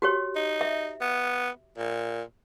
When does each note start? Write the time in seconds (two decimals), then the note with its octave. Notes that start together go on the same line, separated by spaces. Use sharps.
0.02 F#4 G4 C#5
0.36 D#4
0.61 E5
1.01 B3
1.78 A#2